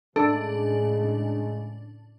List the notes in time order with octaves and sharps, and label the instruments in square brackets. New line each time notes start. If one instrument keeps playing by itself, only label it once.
[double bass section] A2 C#3 [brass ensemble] G#3 [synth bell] D4 [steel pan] A4